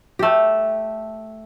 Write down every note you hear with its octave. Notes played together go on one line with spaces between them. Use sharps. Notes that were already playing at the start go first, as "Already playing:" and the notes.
A3 G4